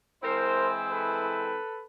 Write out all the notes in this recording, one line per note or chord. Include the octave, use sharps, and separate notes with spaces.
E3 G#3 C4 E4 A#4 C5
A4 B4